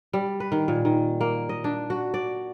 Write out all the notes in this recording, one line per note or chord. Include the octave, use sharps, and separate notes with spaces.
G3
B4
D#3
A#2
D#3
A#3
D#5
D4
F#4
D5